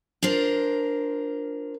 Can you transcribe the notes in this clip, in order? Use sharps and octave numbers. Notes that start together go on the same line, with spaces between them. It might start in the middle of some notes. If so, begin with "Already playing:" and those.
D4 F4 A#4 C5